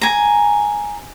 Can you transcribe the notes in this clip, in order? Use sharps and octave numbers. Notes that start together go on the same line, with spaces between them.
G#5 A#5